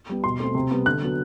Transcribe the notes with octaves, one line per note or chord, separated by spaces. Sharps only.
G3 B3
B2 C6
A3 C4
C3
G3 B3
D3 F#6
F#3 B3